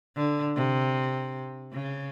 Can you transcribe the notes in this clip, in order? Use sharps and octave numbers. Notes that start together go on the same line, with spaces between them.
D3
C3
C#3